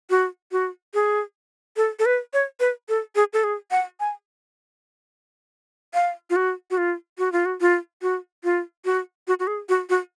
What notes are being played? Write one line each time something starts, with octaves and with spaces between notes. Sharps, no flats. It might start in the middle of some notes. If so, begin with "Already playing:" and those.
F#4
F#4
G#4
A4
A4
B4
C#5
B4
A4
G#4
A4
G#4
F#5
G#5
F5
F4
F#4
F#4
F4
F#4
F4
F#4
F4
F#4
F4
F#4
F#4
F#4
G#4
F#4
F#4